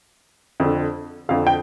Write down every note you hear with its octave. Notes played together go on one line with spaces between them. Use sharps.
F2 D3
F2 D3 F5
G5